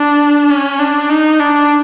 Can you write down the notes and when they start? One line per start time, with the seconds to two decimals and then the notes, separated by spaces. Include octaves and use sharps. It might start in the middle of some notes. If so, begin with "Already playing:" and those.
Already playing: D4
0.49 C#4
0.79 D4
1.10 D#4
1.40 D4